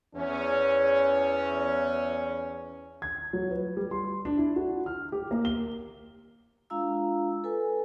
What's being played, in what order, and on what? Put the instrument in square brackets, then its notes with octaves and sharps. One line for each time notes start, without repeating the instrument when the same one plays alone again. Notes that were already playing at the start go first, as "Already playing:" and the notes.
[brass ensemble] E2 C#4
[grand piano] G#6
F#3
B4
G3
C6
D4
E4
F#4
F6
G4
A#3
G7
[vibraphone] G#3 D4 F4 F5 A#5 E6
A4 B4 G#5